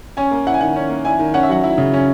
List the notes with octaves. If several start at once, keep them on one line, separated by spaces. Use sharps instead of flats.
C#4 G#5
A#3
E4 F#5
G#5
D#3 F#5
C#4
A#3
E4 G#5
D#3
C#4 F#5
E5
F#3 F#5
E4
C#3
C#4